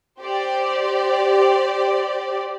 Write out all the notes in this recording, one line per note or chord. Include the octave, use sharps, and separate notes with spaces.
G4 C5 D5